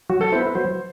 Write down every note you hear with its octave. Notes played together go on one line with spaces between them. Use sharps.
F#3 F#4
A4
B3 E4 C5
B4
F#3 C5